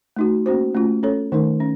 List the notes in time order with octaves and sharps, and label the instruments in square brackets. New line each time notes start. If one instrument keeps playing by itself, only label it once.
[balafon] A3 D#4 F#4
A#3 C#4 F#4 C5
A3 C#4 F4
C#4 A4 C#5
D#3 A3 D#4 A#4
C#4